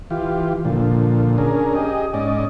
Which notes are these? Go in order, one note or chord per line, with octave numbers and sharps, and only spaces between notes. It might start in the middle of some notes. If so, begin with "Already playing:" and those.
E3 F4 G4
A#2 D3 F3
C#4 D4 G#4 A#4
G4 G#4 D#5
G#2 C#4 D5 D#5